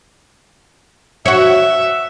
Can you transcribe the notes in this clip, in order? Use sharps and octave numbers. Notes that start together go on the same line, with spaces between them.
F#4 C#5 E5